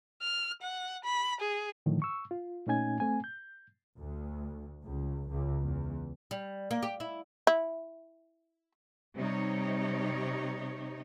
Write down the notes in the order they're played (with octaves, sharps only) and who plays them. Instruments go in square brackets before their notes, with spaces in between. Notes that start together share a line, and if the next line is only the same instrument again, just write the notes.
[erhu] F6
F#5
B5
G#4
[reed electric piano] A2 D3 D#3 F3
C#6 E6
F4
A#2 A3 C#4 D#4 G#5 G#6
A3 C4 G#5
G6
[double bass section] D2
C#2
C#2
E2
[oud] G3
A#3
G4
E4
[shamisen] E4
[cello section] C3 G3 D#4 C#5